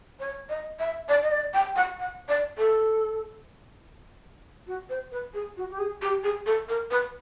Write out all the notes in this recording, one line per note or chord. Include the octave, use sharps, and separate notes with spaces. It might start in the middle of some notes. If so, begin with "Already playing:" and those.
C#5
D#5
E5
D5
D#5
D5
G5
F#5
F#5
D5
A4
F#4
C5
B4
G#4
F#4
G4
G#4
G4
G#4
A4
A#4
B4